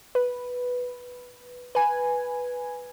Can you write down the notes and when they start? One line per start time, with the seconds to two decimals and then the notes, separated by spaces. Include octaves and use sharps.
0.15 B4
1.75 B4 G#5